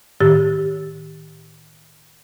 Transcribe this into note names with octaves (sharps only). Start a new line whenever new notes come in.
A2 D#3 G4 E6 A6